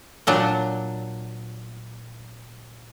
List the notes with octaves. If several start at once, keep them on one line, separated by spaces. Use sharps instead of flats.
A#2 F#3 D4